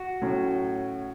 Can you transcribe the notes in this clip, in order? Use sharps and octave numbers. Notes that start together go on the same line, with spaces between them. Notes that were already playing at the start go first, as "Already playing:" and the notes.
Already playing: F#4
A2 F#3 C#4